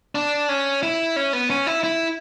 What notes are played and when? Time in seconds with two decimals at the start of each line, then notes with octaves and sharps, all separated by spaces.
0.15 D4
0.49 C#4
0.83 E4
1.16 C#4
1.33 B3
1.50 C#4
1.67 E4
1.84 E4